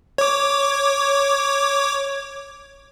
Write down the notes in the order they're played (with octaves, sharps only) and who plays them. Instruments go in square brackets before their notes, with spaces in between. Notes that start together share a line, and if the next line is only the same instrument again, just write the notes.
[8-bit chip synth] C#5 D6